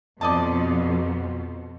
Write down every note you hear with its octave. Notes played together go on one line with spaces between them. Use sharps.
F2 B2 B3 D5 D#5 A5